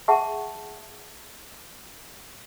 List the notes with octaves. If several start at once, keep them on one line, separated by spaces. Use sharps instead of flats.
G#4 E5 F#5 A5 C#6